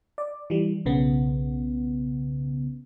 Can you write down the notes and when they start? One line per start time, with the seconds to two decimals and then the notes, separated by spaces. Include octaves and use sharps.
0.18 D5
0.50 E3 G3
0.86 B1 C#3 B3